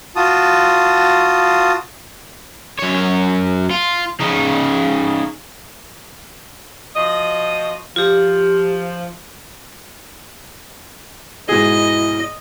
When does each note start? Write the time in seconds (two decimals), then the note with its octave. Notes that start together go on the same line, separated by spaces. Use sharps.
0.16 F4 F#4 A5 D#6
2.79 F#2 C#5
3.70 F4
4.20 C#3 D#4
6.95 F3 F#4 D#5
7.96 F3 F4 G4
11.49 G#2 B2 E4 G#4 D#5